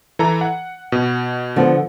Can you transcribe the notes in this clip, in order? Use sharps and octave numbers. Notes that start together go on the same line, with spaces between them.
E3 A4 A#5
F#5
B2
D3 F3 B3